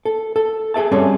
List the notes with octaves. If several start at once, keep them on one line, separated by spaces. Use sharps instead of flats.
A4
A4
G#4 A4 E5 A5
G3 C4 C#4 G#4 A4 C#5